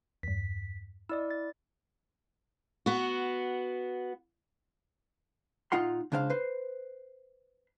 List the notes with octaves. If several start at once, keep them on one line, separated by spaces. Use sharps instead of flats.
E2 G2 B6
E4 D5 D#5 E6
A6
B3 F#4
A#2 D#4 F4 F#5 C6
C#2 C#3 D4 C5 F5
B4 C5